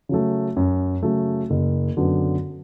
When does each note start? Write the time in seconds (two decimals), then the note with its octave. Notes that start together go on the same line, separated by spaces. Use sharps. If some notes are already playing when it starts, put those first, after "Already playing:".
0.09 C#3 F#3 A3
0.56 F#2
1.03 C#3 F#3 A3
1.50 F#1
1.97 F#2 D3 F#3 B3